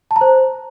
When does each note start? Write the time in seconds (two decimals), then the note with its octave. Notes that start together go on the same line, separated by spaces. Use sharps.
0.11 A5
0.16 A#5
0.21 C5